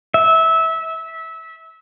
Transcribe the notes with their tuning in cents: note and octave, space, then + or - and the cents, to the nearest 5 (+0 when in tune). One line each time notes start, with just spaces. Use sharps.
E5 -20